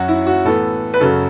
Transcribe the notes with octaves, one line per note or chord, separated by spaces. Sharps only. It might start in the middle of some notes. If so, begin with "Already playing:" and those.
Already playing: F#2 F#3 C#4 F#4
E4
F#4
A2 E3 B3 A4
B4
F#2 C#3 F#3 A4